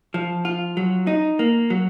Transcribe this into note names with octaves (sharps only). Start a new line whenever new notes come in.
F3
F4
F#3
D#4
A#3
F#3